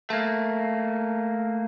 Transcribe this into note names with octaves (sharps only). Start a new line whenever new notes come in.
A3 A#3